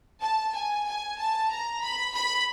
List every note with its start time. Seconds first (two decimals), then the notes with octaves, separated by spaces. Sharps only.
0.22 A5
0.54 G#5
0.87 G#5
1.18 A5
1.50 A#5
1.82 B5
2.14 B5